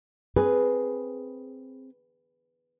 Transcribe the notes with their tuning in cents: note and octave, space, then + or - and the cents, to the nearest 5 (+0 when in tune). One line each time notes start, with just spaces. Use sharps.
C4 +0 G#4 +0 B4 +0